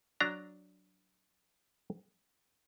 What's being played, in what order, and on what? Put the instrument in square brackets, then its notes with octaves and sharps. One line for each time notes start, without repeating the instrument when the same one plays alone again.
[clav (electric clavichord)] F#3 D4 A#5